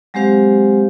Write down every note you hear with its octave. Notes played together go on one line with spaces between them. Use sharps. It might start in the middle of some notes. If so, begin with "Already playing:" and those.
F#3 G#3 C4 G4 C5 F5